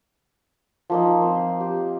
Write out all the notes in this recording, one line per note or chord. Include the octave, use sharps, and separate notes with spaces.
F3 A#3 D#4
C4
C6
G4